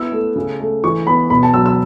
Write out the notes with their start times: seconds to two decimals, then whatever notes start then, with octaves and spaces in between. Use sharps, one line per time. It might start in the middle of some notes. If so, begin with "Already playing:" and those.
Already playing: B3 E4 E6
0.12 A3
0.36 C#3
0.60 A3
0.84 E3 C#6
1.07 B3 B5
1.30 B2 B5
1.43 A5
1.54 F#3 E6
1.66 E6